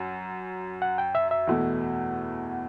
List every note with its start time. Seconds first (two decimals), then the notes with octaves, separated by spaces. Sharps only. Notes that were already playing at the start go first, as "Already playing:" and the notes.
Already playing: F#2 F#5
0.82 F#5
0.98 G5
1.15 E5
1.31 E5
1.47 E2 B2 A3 E4